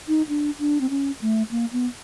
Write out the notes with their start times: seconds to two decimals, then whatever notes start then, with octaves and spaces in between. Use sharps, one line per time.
0.08 D#4
0.29 D4
0.59 D4
0.81 C4
0.90 C#4
1.21 A3
1.51 A#3
1.73 B3